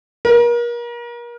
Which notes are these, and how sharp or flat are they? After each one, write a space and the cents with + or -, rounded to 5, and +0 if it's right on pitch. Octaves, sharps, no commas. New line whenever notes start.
A#4 +35